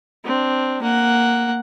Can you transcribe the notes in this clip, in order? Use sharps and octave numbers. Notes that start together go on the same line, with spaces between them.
C4 D4
A#3 F#5